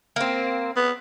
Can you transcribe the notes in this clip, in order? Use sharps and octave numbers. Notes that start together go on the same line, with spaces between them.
A#3 C4
B3